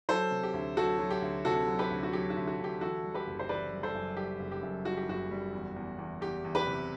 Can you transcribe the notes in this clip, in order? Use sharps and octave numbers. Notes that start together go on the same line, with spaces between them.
F#3 A4 C5
C3
G4
D2
F#3 F#4 A4
F#3
G4
D2
C3 F#4 A4
F#3
G4 B4
D2
F#4
F#3 G4
F#4
D2
F#4
D2 G4
E3 F#4 A4
G3
G4 B4
F#1
C5
E3 B4 D5
G3
A4 C5
F#2
G3 G4
F#1
G4
F#2
G3 F#4
G4
F#1 F#4
G3
E2
E2
E2
E2 G4
E2
G4 B4
C3